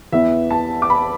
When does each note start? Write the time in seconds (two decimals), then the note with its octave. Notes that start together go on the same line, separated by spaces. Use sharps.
0.12 E2 E3 B3 E5
0.51 A5
0.82 D6
0.90 B5